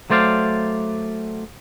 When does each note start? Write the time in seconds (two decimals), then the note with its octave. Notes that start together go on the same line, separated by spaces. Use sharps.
0.10 F#3 A3 C5 D5 F5